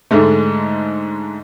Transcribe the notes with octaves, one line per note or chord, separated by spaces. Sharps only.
G#2 D3 G#3 A3